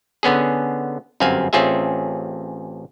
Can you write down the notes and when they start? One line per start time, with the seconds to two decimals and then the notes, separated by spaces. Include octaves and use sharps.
0.23 D3 B3 C#4 G#4
1.20 G1 F#2 C4 F5 G#5
1.53 A1 C4 C#4 F4 G#4 E5